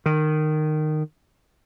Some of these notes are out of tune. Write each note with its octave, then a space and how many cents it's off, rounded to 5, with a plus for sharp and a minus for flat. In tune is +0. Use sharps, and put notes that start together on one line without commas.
D#3 -15